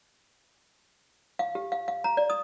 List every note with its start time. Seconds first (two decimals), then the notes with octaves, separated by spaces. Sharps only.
1.39 F5
1.55 G4
1.72 F5
1.88 F5
2.04 A#5
2.17 D5
2.30 D#6